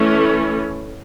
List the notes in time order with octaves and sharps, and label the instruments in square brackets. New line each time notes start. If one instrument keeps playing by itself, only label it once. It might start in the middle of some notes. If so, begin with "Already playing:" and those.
Already playing: [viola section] E3 A3 C#4